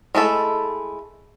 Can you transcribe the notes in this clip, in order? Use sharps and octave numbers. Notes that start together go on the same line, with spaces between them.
G#3 A3 E4 A4